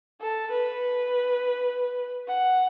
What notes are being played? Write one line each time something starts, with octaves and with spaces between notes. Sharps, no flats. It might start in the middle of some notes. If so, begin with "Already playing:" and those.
A4
B4
F#5